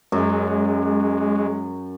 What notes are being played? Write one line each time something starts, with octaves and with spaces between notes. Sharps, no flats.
F#2 G#3